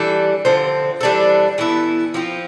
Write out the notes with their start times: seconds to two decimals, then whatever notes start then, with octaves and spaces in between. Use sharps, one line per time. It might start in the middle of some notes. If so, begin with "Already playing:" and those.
Already playing: E3 G3 D4 A4
0.45 D3 F3 C4
1.01 E3 G3 D4 A4
1.58 E3 B3 E4 A4
2.14 F3 C4 F4